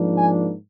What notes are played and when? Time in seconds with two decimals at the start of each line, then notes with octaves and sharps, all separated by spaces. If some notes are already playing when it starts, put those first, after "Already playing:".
Already playing: G#2 F3 A#3 D4
0.17 G#5